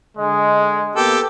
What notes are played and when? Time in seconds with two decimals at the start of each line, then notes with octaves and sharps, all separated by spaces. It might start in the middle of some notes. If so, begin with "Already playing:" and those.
0.17 D3 G#3 D#5
0.96 A#3 B3 G4 A4